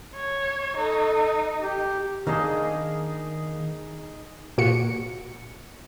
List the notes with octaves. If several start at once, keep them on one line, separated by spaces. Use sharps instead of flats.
C#5
D#4 A4
G4
D#3 A#3 D4 D#4 G#4 D#5
A#2 F#4 C#7